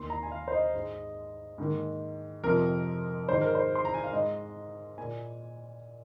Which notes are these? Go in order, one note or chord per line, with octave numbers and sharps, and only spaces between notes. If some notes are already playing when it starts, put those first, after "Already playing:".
Already playing: D#2 D#3 A#3 C6
A#5
G#5
F5
C5
D#5
G#2 G#3
G#2 D#3 A#3
F2 C3 F3 A#4
G#2 D#3 G#3 C5
A#4
C5
C6
A#5
G#5
F5
G#2 G#3 D#5
A#2 A#3 G#5